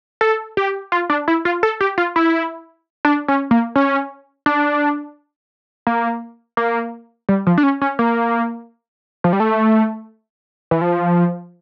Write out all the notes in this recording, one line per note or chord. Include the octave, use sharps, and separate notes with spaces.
A4
G4
F4
D4
E4
F4
A4
G4
F4
E4
D4
C#4
A#3
C#4
D4
A#3
A#3
G3
F3
D4
C#4
C#4
A#3
F3
G3
A3
E3
F3